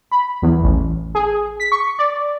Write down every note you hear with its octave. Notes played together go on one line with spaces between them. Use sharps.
B5
E2
A1
G#4
B6
C#6
D5